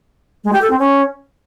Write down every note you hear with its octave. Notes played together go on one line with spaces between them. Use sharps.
G#3
G4
A4
C4
C#4